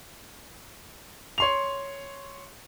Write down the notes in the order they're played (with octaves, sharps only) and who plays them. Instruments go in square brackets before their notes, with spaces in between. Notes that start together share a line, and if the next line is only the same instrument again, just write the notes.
[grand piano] C#5 C6 F7